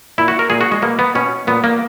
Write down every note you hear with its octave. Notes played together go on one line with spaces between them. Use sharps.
A#2 E4
F#4
A#4
A#2 G#4
F#4
G#3
B2 A#3
B3
B2 C#4
A#2 B3
A#3